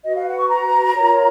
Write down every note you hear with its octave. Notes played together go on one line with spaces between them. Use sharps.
F#4 B4 D#5
F5
F#5
C#6
A#5
F4 A#4 C#5